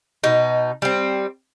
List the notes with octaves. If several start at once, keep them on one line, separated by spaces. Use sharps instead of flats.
B2 D#4
G3 C4